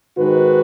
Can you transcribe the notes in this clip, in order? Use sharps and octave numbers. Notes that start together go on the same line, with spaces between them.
G#2 D#3 G#3 F#4 B4